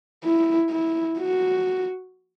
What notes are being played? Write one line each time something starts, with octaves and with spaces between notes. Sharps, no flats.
E4
E4
F#4